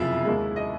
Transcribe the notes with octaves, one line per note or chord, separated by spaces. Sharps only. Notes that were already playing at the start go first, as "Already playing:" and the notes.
Already playing: F#1 F2 C3 E4 F4 E5
D#2 D#3 G#3
D#5